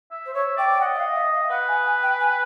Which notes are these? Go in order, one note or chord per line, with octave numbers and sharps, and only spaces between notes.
E5
C5
C#5 E5
D5 G5
G5
D#5 F#5
E5
F5
E5
F5
B4 F#5
G#5
G#5
G5
G#5